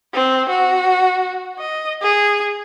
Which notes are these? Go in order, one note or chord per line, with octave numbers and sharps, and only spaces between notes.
C4
F#4
D#5
G#4